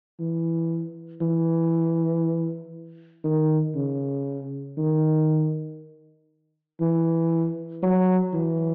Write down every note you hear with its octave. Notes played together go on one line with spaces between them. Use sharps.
E3
E3
D#3
C#3
D#3
E3
F#3
E3